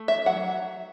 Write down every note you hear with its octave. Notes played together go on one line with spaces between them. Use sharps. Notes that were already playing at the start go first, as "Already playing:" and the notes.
Already playing: A3
E5
F#3 F#5